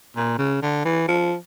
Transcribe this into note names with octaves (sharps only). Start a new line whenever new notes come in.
A#2
C#3
D3
E3
F3